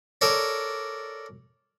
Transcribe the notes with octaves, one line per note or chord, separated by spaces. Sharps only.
A4 A#4 C#5 D5